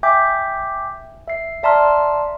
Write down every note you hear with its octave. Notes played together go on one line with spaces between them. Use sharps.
E5 G5 G#5 D6 G6 B6
E5 C7
D5 E5 A5 A#5 C6 F6